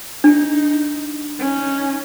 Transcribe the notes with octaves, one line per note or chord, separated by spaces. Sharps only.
D4 D#4
C#4 D#4